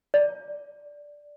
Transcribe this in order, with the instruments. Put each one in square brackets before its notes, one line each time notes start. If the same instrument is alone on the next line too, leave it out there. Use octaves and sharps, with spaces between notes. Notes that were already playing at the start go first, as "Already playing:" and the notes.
[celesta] D5